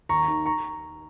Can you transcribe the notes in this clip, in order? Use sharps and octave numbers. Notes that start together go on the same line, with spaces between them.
D#2 A#5 C#6
D#3
A#5 C#6